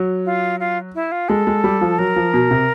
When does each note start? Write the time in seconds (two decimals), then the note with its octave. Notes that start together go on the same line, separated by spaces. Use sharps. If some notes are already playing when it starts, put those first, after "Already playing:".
Already playing: F#3
0.25 F4
0.60 F4
0.95 E4
1.12 F4
1.29 G#3 A4
1.47 G#3
1.64 G3
1.81 F3
1.99 F#3 A#4
2.16 F3
2.34 B2
2.51 C3